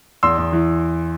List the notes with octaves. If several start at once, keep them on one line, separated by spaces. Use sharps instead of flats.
E2 C6 E6
E2
E3